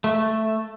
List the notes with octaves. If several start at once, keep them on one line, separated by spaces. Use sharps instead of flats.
A3